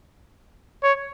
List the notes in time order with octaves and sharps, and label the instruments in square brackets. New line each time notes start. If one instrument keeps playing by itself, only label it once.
[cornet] C#5